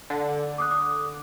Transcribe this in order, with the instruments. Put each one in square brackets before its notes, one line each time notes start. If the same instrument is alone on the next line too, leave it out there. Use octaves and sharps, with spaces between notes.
[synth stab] D3
[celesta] D6 D#6 F#6
D6 D#6